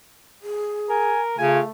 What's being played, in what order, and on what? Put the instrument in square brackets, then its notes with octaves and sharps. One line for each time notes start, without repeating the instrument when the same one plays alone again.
[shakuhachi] G#4
[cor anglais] A#4 [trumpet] G#5
[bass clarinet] C#3 [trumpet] A3 [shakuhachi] F4 [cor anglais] G#5